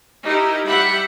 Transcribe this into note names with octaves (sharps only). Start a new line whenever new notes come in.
D#4 E4 G4 A#4
G3 E5 F#5 G5 B5